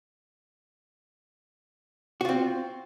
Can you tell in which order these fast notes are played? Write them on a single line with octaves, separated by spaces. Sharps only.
F#4 F4 C4